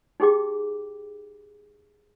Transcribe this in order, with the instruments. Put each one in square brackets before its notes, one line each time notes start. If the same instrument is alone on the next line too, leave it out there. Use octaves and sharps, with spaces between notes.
[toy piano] D#4 G4 G#4 G5 D6